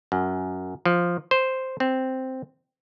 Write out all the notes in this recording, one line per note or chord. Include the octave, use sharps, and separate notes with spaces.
F#2
F3
C5
C4